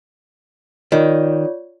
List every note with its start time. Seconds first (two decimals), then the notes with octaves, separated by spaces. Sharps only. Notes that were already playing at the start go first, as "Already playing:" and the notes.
0.92 D#3 F4 C#5 D5